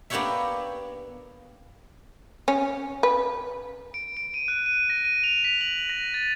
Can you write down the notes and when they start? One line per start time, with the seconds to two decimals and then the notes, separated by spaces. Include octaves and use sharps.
0.10 A#3 B3 D4 G4 C#5 E5
2.48 C#4
3.03 B4
3.94 D7
4.17 D7
4.34 D#7
4.48 F#6
4.66 D#7
4.90 A#6
5.05 D#7
5.24 F7
5.44 B6
5.61 F#7
5.90 A#6
6.14 A6